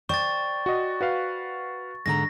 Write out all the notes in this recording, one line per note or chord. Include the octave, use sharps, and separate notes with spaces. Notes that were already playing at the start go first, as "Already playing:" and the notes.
C5 D5 G5 C#6 A6
F#4 D#5
F#4 B4 F5
G#2 D3 A#5 A#6